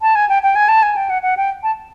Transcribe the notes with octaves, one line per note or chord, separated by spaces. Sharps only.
A5
G#5
G5
G5
G#5
A5
G#5
G5
F#5
F#5
G5
A5